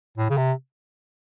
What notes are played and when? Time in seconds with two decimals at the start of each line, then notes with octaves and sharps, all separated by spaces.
0.18 A2
0.30 C#3
0.37 C3